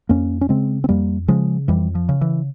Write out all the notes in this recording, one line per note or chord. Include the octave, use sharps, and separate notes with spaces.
F2 A#3 C#4
C#4
C#3 G#3 C4
C4
F2 G3 A#3
C#3 F3 G#3
F2 E3 G3
F3
C#3
E3